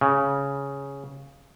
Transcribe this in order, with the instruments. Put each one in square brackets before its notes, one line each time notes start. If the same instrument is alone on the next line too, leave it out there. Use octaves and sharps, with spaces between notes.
[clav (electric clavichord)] C#3